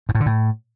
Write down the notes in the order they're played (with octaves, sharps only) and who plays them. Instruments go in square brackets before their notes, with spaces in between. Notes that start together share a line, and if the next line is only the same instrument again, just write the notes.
[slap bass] G#2
A2
D3
A2